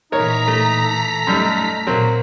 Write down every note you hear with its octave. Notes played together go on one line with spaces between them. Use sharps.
A#2 E3 D#4 A#4 C#5 A#5 B6
A3
A4
F#2 G3 A3 D#4
A#2 F#3 A#3 C4 F#4